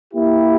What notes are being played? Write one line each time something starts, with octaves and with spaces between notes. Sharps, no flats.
A#3 E4 G4